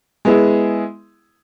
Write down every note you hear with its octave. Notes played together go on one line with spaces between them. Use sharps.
G#3 B3 E4 G#4